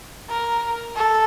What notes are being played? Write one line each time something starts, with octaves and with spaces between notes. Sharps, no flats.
A#4
A4